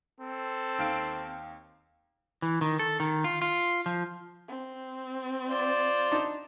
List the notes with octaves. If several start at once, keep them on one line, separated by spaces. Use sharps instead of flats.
C4 A4
D#2 F5 D7
E3
D#3
A4
D#3
F4
F4
F3
C4
F4 C5 D5
D4 D#4